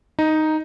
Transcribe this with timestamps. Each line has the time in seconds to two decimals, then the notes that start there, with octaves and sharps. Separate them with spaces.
0.19 D#4